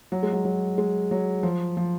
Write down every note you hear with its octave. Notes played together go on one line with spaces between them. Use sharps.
F#3
G#3
F#3
F#3
G#3
F#3
F3
F3